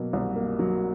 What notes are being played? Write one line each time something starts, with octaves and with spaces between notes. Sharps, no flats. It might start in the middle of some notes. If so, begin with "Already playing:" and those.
Already playing: B2 F#3 A#3
C2
A#3
F#3